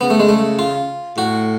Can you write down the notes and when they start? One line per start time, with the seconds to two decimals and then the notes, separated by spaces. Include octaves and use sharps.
0.01 C#3 B3
0.10 A3
0.20 G#3
0.29 A3
0.59 F4
1.17 A2 F#4